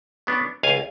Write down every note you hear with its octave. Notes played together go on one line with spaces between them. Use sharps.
F#3 B3 D4
C#2 F5 G#5